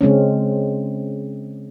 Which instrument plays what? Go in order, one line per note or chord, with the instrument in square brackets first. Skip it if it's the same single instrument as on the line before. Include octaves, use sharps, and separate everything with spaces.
[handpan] C#3 G#3 C4 C#4